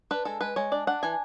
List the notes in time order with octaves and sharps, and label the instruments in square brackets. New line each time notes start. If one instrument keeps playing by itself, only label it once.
[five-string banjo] D4 B4
G#3 A4
G#3 B4
G#3 C#5
D4 D5
D4 F#5
E3 G#5